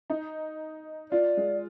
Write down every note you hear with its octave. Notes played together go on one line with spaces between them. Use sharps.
D#4
F4 D5
G#3